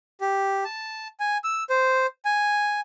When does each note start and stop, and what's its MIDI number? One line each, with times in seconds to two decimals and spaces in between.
0.21 0.64 67
0.64 1.08 81
1.20 1.38 80
1.44 1.64 88
1.70 2.06 72
2.25 2.81 80